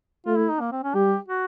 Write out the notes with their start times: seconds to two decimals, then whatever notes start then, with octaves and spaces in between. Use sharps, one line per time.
0.26 A3 F4
0.38 E4
0.49 D#4
0.60 A#3
0.72 C4
0.83 C#4
0.94 G3 G4
1.28 F#4